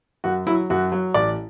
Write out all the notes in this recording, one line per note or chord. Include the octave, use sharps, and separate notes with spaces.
F#2 F#4
F#3 E4
F#2 F#4
F#3
A1 D5